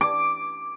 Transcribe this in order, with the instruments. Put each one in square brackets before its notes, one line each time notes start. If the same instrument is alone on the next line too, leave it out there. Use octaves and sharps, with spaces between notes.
[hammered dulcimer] D6